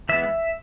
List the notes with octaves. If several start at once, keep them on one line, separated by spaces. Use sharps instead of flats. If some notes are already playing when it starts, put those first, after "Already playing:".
E3 G#3 B3 E5